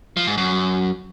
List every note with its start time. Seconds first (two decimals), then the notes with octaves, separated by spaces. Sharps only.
0.17 F3
0.27 G#2
0.37 F#2